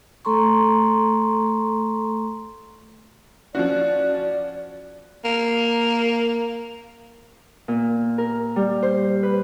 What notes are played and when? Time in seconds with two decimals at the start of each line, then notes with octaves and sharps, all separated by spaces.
0.25 A3 A4 A#5 C6 C#6
3.55 F3 C#4 F#4 D5
5.25 A#3
7.68 A#2
8.18 A#4
8.56 G3
8.82 C5
9.23 B4